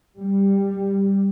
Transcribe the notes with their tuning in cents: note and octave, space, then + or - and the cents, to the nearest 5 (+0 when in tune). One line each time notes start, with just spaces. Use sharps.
G3 +10